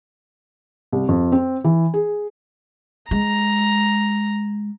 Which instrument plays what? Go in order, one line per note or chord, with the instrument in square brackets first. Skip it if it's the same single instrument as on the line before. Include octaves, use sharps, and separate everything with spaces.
[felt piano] C2
F2
C4
E3
G#4
[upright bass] G#3 [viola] A#5